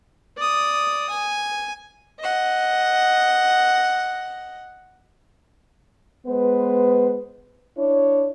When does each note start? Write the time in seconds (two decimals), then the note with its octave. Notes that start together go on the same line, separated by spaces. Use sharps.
0.37 D5 D#6
1.10 G#5
2.18 D#5 F#5
6.27 G#3 B3 B4 C5
7.78 D4 E4 C#5